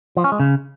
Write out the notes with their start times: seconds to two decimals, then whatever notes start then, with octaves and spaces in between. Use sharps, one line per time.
0.17 F3
0.24 C#4
0.32 G#3
0.40 C#3